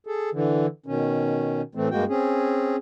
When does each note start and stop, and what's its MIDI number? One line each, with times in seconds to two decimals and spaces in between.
0.07 0.30 68
0.07 0.30 69
0.33 0.66 50
0.33 0.66 52
0.86 1.61 47
0.86 1.61 51
0.86 1.61 61
1.75 1.88 45
1.75 1.88 52
1.75 1.88 57
1.75 1.88 60
1.91 2.05 43
1.91 2.05 56
1.91 2.05 58
1.91 2.05 66
1.91 2.05 79
2.09 2.76 60
2.09 2.76 61
2.09 2.76 68